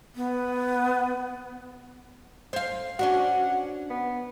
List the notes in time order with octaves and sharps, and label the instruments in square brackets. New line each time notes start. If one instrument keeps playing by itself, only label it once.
[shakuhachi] B3
[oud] C5 F5
[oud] C#4 D4 F#4 [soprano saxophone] F#5
[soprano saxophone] B3